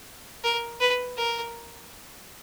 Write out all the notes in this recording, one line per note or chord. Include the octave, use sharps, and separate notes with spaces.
A#4
B4
A#4